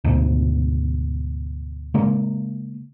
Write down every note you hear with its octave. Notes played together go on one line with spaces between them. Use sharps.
D2 G#2 B2
C#3 G#3 A#3